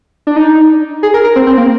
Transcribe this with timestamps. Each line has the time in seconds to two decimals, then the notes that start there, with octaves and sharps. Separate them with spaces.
0.27 D4
0.36 D#4
1.03 G#4
1.14 A#4
1.24 A#4
1.36 C4
1.47 C4
1.57 A#3